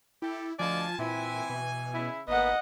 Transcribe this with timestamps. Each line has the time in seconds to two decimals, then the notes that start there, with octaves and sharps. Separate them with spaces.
0.22 E4 G4 A4
0.60 D2 F3 D5 D#5 F5 G#5 A5
0.99 A#2 E3 C4 E4 G#5
1.50 B2
1.95 C#3 E4
2.28 G#1 A#3 B3 D#5 F#5